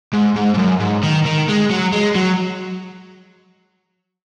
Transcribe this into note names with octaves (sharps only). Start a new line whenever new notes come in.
G#2
G#2
G#2
F#2
G#2
D#3
D#3
G#3
F#3
G#3
F#3